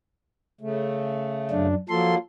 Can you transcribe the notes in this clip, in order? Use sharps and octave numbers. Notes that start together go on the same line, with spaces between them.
C#3 A3
F#2 D4
F3 F#3 A#3 A4 C6